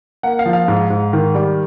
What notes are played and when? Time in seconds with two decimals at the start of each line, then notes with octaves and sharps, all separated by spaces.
0.23 A#3 F#5
0.39 F5
0.46 F3
0.53 F5
0.68 G#2
0.90 G#2
1.13 D#3
1.35 G3